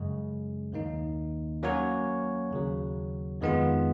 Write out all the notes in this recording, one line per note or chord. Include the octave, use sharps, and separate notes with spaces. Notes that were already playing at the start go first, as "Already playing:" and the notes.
Already playing: F#2 C#3 G#3
D#2 D#3 A#3 D#4
F#3 A#3 C#4 F#4 C#5
D#2 C#3 F#3
F2 D#3 G#3 B3 F4